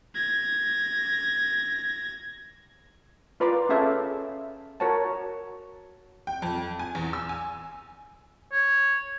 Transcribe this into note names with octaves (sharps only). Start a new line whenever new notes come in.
G#6 A#6
F4 B4 D5 A#5 C6 D6
C#4 G#4 A4 E5 F5
F#4 A#4 C#5 F#5 A5
G5
F2
G#5
E2
E6
G#5
C#5